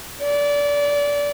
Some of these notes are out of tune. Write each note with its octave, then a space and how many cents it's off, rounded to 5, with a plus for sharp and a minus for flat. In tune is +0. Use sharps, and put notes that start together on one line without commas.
D5 -25